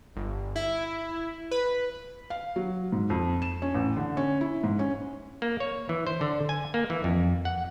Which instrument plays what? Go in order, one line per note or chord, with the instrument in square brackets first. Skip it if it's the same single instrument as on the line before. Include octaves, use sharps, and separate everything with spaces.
[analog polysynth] G1
E4
B4
[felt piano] F5
F#3
G#2
F2
E7
C#4
A1
D3
C#4
E4
G#2
C#4
[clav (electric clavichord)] A#3
C#5
E3
C5
D3
G#5
A#3
E3
F2
F#5